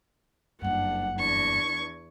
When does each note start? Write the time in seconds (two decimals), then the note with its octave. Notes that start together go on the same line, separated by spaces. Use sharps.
0.62 F#1 G2 D4 F#5
1.16 E2 D4 C#6 G#6